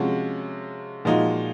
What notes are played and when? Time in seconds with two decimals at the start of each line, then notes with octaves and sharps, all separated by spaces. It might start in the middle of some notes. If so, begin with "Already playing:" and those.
Already playing: C3 F3 G#3 C#4 F#4
1.05 A#2 F3 G#3 D#4 F#4